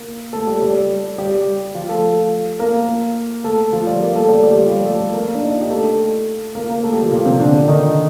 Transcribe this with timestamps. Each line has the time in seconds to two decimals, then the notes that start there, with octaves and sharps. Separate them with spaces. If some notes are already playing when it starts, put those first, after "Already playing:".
Already playing: A#3 A#4
0.33 A3 A4
0.47 G3 G4
0.61 G3 G4
1.18 G3 G4
1.75 F3 F4
1.89 A3 A4
2.59 A#3 A#4
3.44 A3 A4
3.72 F3 F4
3.87 G3 G4
4.01 A#3 A#4
4.15 A3 A4
4.28 G3 G4
4.43 G3 G4
4.57 F3 F4
4.72 G3 G4
4.86 A3 A4
5.14 A#3 A#4
5.35 D4
5.43 D#4
5.52 F4
5.61 G4
5.70 A3 A4
6.55 A#3 A#4
6.69 A#3 A#4
6.83 A3 A4
6.93 G3 G4
7.02 F3 F4
7.12 A#2 A#3
7.26 C3 C4
7.40 D3 D4
7.68 D#3 D#4